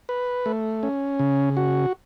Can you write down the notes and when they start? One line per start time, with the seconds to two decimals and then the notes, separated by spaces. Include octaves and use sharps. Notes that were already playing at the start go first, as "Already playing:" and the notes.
0.09 B4
0.46 A3
0.83 C#4
1.19 C#3
1.57 F#4